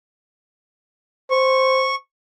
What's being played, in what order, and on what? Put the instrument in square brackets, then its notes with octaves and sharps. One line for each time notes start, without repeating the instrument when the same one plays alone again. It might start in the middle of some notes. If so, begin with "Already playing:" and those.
[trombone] C5 [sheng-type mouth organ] C#6